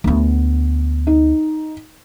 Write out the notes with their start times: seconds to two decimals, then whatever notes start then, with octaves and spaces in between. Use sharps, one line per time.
0.04 D2 B3
1.07 D#4